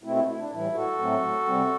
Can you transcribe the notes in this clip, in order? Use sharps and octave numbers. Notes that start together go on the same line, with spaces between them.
B2 A3 C4 E4
E4
E4
D4
A2 E3 G3 E4
F#4 A4
A2 F#3 A3 C4
C3 G3 C4